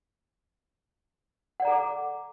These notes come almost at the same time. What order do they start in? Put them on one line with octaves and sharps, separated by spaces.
F#5 D5 A#5 A4 D6